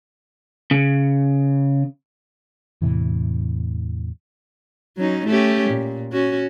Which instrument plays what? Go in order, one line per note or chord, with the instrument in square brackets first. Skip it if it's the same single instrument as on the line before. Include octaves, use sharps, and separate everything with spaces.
[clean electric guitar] C#3
[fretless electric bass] E2 A2 C3 E3
[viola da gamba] F#3 C#4 D#4
A3 C#4 G4
A#2
C#4 F#4